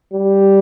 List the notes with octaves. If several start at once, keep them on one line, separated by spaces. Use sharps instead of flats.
G3